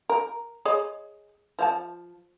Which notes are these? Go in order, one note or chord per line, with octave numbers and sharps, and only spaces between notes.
A#4
G#4 C#5 D#5
F3 F5 A5